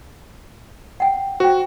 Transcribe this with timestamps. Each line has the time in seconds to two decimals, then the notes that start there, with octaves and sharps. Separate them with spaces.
1.00 F#5 G5
1.40 F#4 C5 G5